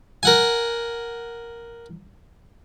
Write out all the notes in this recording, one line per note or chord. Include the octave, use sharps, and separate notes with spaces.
A#4 F#5 G#5